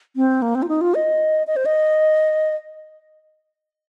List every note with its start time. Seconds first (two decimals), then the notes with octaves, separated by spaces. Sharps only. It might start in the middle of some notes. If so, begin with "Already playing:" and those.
0.16 C4
0.42 A#3
0.55 C4
0.63 F4
0.69 D#4
0.81 F4
0.95 D#5
1.47 D#5
1.56 C5
1.66 D#5